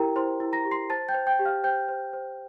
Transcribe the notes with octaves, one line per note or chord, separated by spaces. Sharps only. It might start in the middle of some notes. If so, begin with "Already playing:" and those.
Already playing: E4 G4 A#4 G5 A#5
E4 C5 C6
E4
A#5 A#6
G4
C6 C7
C5 A5 A6
G5 G6
C5
G5 G6
G4
F5 F6
C5 G5 G6
C5
C5